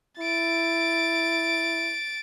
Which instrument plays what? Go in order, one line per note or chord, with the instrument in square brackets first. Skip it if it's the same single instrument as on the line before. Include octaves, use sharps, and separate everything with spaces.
[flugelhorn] E4 [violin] A6 D7